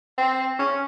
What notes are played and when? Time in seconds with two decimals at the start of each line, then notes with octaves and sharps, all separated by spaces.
0.18 C4
0.59 C#4